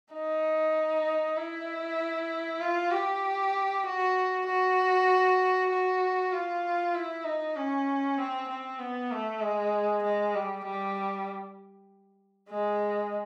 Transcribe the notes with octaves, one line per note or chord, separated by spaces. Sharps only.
D#4
E4
F4
G4
F#4
F#4
F#4
F4
E4
D#4
C#4
C4
C4
B3
A3
G#3
G#3
G3
G3
G#3